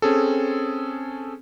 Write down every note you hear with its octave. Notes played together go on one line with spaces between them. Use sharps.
C4 C#4 G#4 A4